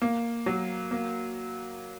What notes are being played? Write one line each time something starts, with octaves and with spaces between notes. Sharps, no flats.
A#3
F#3
A#3